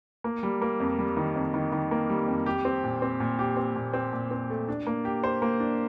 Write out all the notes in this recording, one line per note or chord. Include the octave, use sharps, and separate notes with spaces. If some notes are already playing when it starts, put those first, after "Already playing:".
A#3
G3
A#3
F2
G3
D#3
F2
D#3
D#3
A#3
G3
F2
G4
C4
A#2
C4
A#2
G4
C4
A#2
C4
A#2
C4
A3
D4
A#3
G4
C5
A#3
D4